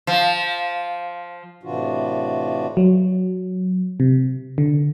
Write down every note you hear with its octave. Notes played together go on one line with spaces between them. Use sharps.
F3
A2 C3 E3 D4 F4 F#4
F#3
C3
D3